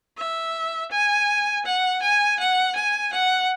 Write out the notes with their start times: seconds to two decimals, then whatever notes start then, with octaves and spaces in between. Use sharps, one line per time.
0.18 E5
0.91 G#5
1.65 F#5
2.02 G#5
2.39 F#5
2.75 G#5
3.12 F#5